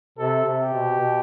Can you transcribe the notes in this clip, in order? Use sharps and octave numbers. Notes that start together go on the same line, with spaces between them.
C3 A4
C3
G4
B2
B2